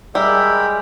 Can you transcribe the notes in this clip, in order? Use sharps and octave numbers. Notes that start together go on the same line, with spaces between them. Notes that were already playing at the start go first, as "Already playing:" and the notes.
G3 G#3 A#4 E5 G5 B5